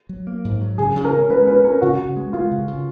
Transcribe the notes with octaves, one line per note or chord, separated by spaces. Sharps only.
F#3
A#3
G#2
F#3
C#3 G#4
C#3
A#4
C#4
G#3 B4
C#4 B4
C#4 A#4
C#3 F#4
C#3
G#3
G#3 F4
C#3
C#3